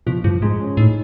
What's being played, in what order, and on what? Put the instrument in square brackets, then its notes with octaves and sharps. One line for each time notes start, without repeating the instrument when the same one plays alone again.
[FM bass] B2 [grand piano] F3
[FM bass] G2 [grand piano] F3
[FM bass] G#2 [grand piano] G#3
[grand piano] C#4
[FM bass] A2 [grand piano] D#4